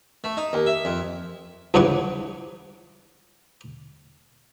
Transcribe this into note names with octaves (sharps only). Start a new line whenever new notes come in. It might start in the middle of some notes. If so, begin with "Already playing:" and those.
A3
D#4
D#2
E5
F2
C#2 G2 E3 C#5 F#5 C#6